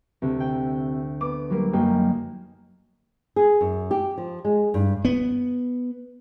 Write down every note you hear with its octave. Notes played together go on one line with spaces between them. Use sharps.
D2 C3
G5
B3 D6
F#3 G3 A#3
F#2 A#3 D#4 G5
G#4
F#2
G4
F3
G#3
G2
B3